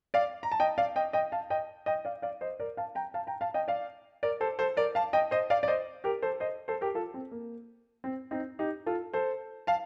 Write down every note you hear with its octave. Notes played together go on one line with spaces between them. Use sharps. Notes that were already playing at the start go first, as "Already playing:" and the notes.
D5 F5
A#5
A5
D#5 G5
D5 F5
D#5 G5
D#5 G5
F5 A5
D#5 G5
D#5 G5
D5 F5
D5 F5
C5 D#5
A#4 D5
F5 A5
G5 A#5
F5 A5
G5 A#5
F5 A5
D#5 G5
D5 F5
A#4 D5
A4 C5
A4 C5
A#4 D5
F5 A5
D#5 G5
C5 D#5
D5 F5
D5
C5 D#5
G4 A#4
A4 C5
C5 D#5
A4 C5
G4 A#4
F4 A4
C4
A#3
C4
C4 D#4
D#4 G4
F4 A4
A4 C5
F5 A5